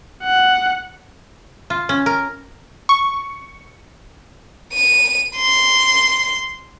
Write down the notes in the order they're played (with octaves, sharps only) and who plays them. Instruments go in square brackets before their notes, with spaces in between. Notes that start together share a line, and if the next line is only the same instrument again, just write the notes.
[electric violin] F#5
[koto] F4
C#4
A#4
[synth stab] C#6
[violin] D#7
C6